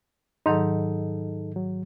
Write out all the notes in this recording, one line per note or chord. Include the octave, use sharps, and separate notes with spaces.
G#2 D#3 F#3 D#4 A4
F#3